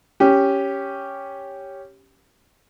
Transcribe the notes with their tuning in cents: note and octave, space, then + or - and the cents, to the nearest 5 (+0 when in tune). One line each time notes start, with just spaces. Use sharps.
C#4 +0 G4 +0